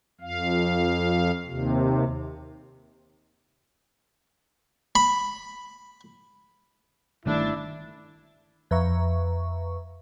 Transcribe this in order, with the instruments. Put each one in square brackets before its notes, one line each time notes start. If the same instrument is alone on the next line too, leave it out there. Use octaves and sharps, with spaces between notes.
[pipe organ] F2 F5
D#2 C3
[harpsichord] B5
[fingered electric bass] G1 D#3 A3 [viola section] D4 [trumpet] E4
[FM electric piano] F2 B4 E5 A#5 C#6